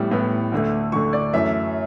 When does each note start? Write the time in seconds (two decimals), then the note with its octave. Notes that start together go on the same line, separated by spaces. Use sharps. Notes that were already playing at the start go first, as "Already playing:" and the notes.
Already playing: A2 E3 G3 B3
0.11 A2 E3 G3 B3
0.52 D2 D3 A3
0.92 D2 C#6
0.95 D3 A3
1.13 D5
1.33 F#2 E3 A3 E5